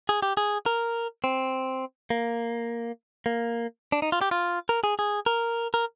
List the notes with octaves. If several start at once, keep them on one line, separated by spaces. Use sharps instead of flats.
G#4
G4
G#4
A#4
C4
A#3
A#3
D4
D#4
F4
G4
F4
A#4
G#4
G#4
A#4
A#4